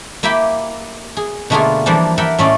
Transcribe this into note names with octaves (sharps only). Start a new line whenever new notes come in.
A#3 E4 G4 E5 G5 B5
G#4
B2 D3 A3 A#3 F4 G#4
E3 F3 G3 A#3 D4
A#4 D5 E5 F#5 G5 B5
A2 A3 C#4 D5 D#5